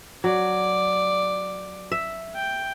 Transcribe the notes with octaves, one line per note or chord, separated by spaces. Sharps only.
F#3 D5
E5
G5